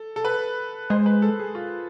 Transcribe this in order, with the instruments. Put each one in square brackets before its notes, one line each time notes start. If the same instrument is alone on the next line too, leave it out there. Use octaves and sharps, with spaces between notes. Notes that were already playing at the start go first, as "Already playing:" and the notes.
Already playing: [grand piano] A4
A4
B4
[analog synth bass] G#3 [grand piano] C5
[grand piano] B4
A4
G#4
F4